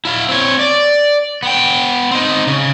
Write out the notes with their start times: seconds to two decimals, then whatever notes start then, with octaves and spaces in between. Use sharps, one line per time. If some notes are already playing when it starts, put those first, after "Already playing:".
0.05 E4 F5
0.29 C4 C#5
0.59 D5
1.43 B3 G5
2.11 C4 D#4
2.47 C#3